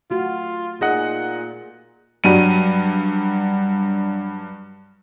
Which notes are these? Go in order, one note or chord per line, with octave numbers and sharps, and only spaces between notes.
A3 F4 F#4
A#2 D#4 G#4 D#5 F#5
G2 F#3 G3 D#7